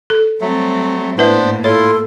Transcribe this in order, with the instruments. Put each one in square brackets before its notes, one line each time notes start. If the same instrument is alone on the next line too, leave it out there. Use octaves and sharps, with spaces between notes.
[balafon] A4
[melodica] F#3 A3 [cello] G3 C4
[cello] A2 A#3 [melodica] B3 D4 C5 [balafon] E4 B4 E5
[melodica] E4 F4 C6 [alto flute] A4 [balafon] C#5